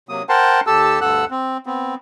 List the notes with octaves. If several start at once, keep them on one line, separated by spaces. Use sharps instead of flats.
C3 F#3 A#3 D#6
A#4 C5 F#5 G5 A5 C6
D#2 G4 A4 A5 E6
D2 G2 A4 F#5 E6 F#6
C4
B3 C4